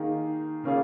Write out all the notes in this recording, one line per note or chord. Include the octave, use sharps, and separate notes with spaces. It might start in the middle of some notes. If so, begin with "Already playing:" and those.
Already playing: D#3 A#3 D#4 G#4
C#3 A#3 C#4 F4 G#4